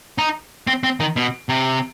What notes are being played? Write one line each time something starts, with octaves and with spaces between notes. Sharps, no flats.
D#4
C4
C4
D#3
B2
C3